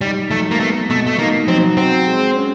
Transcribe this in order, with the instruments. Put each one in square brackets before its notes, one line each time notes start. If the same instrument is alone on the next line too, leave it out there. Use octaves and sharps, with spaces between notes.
[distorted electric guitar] G3 [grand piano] D#4
[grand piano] F#3 [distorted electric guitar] A3
[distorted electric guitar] A#3
[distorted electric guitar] A3 [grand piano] B3
[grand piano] B2 [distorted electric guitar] A3
[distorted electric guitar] A3
[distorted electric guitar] A#3 [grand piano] D#4
[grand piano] F#3 [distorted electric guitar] C4
[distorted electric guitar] C4 [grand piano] F#4
[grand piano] G#3
C#4